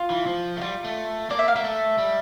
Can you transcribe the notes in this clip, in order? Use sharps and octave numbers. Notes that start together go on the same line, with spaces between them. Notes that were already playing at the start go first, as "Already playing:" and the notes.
Already playing: F4
E3
F3
A3
G3 F4
A3
A#3 D5
E5
F5
A#3 E5
A3
G3